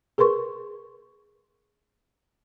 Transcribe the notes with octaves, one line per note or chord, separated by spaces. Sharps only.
G#4 A#4 B4 C6 C#6